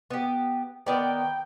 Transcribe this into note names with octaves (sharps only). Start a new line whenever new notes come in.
B3 G4
D#3 B3 D5 G5